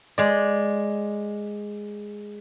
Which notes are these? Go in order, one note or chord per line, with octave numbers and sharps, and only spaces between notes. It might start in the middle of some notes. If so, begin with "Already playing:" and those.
G#3 D5